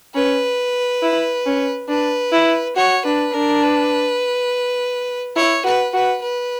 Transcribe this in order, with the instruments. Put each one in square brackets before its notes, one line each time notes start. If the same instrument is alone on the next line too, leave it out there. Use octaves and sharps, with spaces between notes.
[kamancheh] C#4 [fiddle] B4
[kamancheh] E4
C#4
[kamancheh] D4 [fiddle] B4
[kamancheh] E4
[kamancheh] F#4 [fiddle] C#5
[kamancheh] D4 [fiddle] B4
[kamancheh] D4 [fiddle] A#4
[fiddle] B4
[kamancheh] E4 [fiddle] C#5
[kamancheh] F#4 [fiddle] B4
[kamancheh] F#4 [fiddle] B4
[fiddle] B4